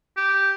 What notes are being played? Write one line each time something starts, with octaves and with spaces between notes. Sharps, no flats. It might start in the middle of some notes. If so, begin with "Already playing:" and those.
G4